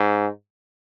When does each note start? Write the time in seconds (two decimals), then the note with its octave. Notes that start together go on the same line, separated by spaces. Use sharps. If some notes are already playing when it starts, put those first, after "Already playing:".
Already playing: G#2